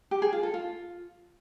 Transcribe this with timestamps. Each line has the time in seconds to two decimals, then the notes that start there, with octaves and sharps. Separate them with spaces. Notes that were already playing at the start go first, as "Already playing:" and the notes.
0.11 G4
0.22 G#4
0.32 F4
0.43 A4
0.54 F4